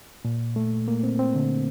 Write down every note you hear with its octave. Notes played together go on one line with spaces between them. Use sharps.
A#2
A3
A#3
C4
C4
D3